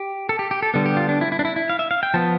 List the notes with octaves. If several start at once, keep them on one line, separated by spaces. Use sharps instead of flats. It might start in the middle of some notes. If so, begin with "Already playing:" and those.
Already playing: G4
A4
G4
G4
A4
D3 G3 B3 A4
G4
F4
D4
E4
E4
D4
E4
E4
F5
E5
F5
G5
F3 B3 A5